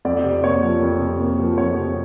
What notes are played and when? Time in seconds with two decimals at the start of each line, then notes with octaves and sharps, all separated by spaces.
0.05 F2 D5
0.24 C3
0.43 A#3 C#5
0.63 F3
0.82 F2
1.00 C3
1.20 A#3
1.39 F3
1.58 F2 C#5
1.77 C3